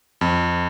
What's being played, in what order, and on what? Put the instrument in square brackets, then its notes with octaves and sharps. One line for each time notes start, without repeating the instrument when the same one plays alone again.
[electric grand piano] F2